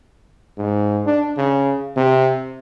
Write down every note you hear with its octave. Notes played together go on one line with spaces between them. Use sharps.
G#2
D4
C#3
C3